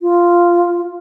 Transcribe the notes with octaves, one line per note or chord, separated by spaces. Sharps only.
F4